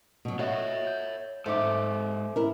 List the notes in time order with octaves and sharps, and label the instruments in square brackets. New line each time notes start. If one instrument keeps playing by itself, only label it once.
[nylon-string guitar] B2 F#3
[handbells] F#4 D#5 [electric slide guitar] C#5 E5 [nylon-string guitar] F#5
[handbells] G6
[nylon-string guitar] G#2 D#4 [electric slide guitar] G#3 A4 [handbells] C5 E5 D6
[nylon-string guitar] E4 A#4